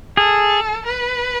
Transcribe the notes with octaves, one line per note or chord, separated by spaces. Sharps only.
G#4 A4
B4